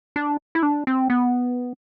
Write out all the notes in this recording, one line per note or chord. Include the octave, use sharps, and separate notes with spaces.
D4
E4
D4
C4
B3